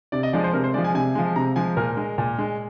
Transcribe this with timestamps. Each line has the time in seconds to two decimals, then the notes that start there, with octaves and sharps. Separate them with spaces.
0.12 C3 D5
0.23 D#5
0.33 F3 G#3 D5
0.44 C5
0.54 C3 A#4
0.64 C5
0.74 F3 G#3 D5
0.84 G#5
0.95 C3 G#5
1.15 F3 G#3
1.36 C3 A#5
1.56 F3 G#3 G#5
1.77 A#2 A#4
1.97 G#3
2.18 A#2
2.38 G#3